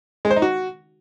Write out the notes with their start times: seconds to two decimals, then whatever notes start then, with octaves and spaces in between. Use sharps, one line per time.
0.25 G#3
0.31 C5
0.36 D#4
0.42 F#4